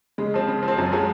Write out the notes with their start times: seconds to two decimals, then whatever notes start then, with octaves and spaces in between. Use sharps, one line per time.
0.18 C#3 G#3
0.34 F3 C4
0.48 C#3
0.63 F3
0.68 C4
0.77 F#2 F#3
0.92 F3 F#3 G#3